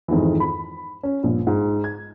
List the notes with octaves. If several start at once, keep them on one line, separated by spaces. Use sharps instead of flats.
F2 G#2 D#3 E3
B5
C#4
A#1 G2
G#2
G#6